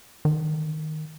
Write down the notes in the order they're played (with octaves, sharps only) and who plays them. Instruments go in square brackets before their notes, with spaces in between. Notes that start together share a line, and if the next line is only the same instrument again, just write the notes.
[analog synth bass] D#3